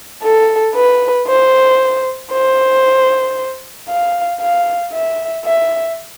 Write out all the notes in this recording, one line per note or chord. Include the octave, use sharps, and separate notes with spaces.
A4
B4
C5
C5
F5
F5
E5
E5